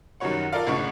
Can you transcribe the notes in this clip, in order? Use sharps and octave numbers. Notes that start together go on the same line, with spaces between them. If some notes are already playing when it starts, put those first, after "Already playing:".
F#2 D#3 F#3 G3 C#5 F#5
F4 A4 A#4 D5 F5
G#1 A2 C#3 D4 F#5 C#6